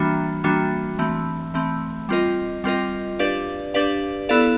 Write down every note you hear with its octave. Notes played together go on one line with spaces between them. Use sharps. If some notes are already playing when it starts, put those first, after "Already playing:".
Already playing: E3 G3 A#3 D4 F#4
E3 G3 A#3 D4 F#4
E3 A3 C4
E3 A3 C4
G3 C4 F4 A#4 D#5
G3 C4 F4 A#4 D#5
D4 G4 B4 D5 F5
D4 G4 B4 D5 F5
B3 E4 A4 D5 F5